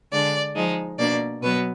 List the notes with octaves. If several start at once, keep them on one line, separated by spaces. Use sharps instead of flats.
D3 G#3 D4 D5
F3 G#3 D#4
B2 A#3 D4 D5
B2 F#3 B3 B4